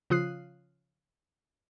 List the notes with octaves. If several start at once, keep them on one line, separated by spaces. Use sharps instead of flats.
C#3 F3 F4 D#6 F#6 C7